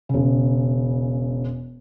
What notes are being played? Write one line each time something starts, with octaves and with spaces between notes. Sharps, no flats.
E1 C#3